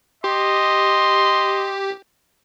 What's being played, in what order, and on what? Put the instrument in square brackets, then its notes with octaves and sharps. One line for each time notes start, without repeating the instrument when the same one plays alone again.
[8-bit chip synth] G4 [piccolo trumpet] D#5 [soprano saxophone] C6